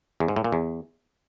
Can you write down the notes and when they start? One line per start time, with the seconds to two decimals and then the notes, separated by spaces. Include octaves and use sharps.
0.20 E2
0.28 G#2
0.36 A2
0.44 A#2
0.52 E2